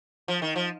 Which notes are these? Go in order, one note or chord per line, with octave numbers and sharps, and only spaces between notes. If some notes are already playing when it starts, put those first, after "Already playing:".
F3
D#3
F3